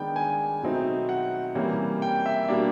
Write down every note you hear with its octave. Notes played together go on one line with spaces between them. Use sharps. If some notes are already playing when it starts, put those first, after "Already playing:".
Already playing: D#3 G#3 B3 D4 G5
G#5
B2 F#3 A3 C4 D#4
F#5
C3 E3 G3 A#3 C#4
G5
E5
B2 G3 A#3 D4